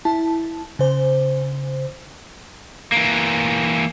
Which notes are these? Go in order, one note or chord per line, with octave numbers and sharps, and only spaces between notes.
E4 A5
C#3 C5
E3 A#3